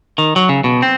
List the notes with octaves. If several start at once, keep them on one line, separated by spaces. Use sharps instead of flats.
D#3
F#3
C#3
B2
C4